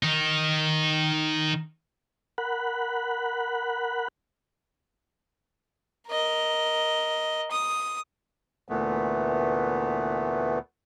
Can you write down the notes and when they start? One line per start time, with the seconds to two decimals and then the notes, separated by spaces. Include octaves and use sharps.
0.03 D#3 D#4
2.38 A#4 F#5 B5 F#6
6.08 A#4 D#5
7.51 D#6
8.68 D2 A#2 E3 A3 B3